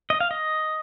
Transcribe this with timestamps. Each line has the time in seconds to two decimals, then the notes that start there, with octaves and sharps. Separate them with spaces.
0.10 D#5
0.20 F5
0.31 D#5